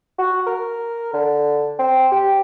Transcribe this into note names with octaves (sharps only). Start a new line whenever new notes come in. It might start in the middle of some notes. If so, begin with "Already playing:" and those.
F#4
A#4
D3
C4
G4